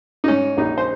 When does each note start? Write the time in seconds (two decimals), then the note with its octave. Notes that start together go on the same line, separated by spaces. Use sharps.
0.24 D#4
0.28 G#2 C#4
0.57 A#1 D#4
0.78 C5